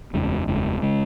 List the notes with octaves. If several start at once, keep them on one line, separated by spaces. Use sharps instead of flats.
F#1 E2 C#3 G#3
F#1 E2 C#3 G#3
C#3 G#3